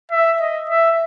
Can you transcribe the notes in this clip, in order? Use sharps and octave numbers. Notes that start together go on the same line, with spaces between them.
E5
D#5
E5